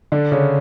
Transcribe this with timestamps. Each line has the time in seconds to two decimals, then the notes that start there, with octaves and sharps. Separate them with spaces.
0.12 D3 D4
0.32 C#3 C#4